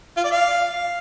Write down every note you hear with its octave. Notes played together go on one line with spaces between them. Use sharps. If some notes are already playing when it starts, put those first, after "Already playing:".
F4
D5
F5